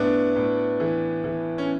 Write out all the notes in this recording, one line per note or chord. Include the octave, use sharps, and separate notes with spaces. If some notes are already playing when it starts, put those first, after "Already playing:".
Already playing: A2 B3 D4
A2
E3
E3
C#4